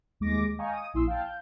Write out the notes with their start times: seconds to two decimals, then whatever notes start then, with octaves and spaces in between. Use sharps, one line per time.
0.20 D#2 G#3 D6 A#6
0.59 D#5 F5 G5 G#5 A#5 C#6
0.72 D#6 D#7
0.94 A#1 E4 C6 E6
1.08 F5 G5 A5
1.25 G6